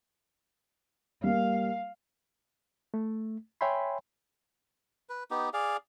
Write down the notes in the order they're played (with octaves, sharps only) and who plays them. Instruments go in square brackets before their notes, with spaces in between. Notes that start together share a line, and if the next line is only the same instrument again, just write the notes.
[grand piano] G3 A#3 [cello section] F5
[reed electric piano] A3
C#5 E5 G5 G#5 B5 C6
[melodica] B4
B3 D#4 G4
G#4 D5 F5